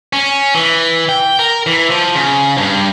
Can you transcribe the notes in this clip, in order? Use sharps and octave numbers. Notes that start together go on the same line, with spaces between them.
C#4
E3
G5
A#4
E3
F3
C#3
G2